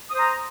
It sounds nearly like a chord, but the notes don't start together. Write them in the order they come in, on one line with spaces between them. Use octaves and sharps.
D#6 C5 A#5